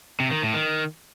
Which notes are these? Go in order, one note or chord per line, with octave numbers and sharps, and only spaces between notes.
C3
D#3
A2
D#3